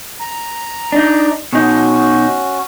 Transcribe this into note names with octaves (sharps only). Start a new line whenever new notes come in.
A#5
D4 D#4
B2 C#4 D#4 F#4